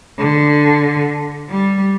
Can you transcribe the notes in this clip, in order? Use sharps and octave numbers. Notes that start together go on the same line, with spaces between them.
D3
G3